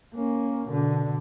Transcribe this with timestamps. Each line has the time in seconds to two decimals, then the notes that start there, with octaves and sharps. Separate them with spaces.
0.15 A#3 C#4
0.68 B2 D3